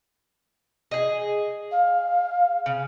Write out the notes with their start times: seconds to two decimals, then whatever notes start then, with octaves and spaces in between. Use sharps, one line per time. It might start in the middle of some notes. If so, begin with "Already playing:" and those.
0.91 G#4 D#5
1.71 F5
2.66 C#3